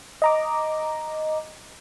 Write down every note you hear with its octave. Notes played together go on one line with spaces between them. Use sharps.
D#5 A#5 D6